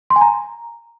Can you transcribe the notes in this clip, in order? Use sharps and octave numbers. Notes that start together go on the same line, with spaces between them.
C6
G#5
A#5